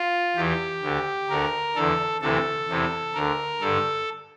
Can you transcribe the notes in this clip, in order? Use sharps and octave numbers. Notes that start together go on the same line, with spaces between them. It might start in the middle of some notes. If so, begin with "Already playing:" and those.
Already playing: F4
E2 E3 G4
D2 D3
D2 D3 A#4
E2 D3 A4
D2 C3 E3 A4
E2 C3 E3
D2 D3 A#4
G2 D3 A4